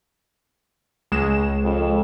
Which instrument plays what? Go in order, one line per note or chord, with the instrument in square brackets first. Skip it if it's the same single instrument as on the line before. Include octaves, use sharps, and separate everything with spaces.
[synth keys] C#2 G#3 E7
[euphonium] F2